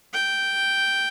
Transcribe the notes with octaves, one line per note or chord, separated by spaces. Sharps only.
G5